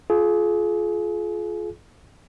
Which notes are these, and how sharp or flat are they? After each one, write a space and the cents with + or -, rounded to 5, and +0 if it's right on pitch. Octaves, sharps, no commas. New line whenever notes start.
F4 +0 G#4 +35